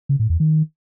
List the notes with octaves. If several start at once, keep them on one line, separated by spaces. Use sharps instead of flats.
C#3
A2
E2
D#3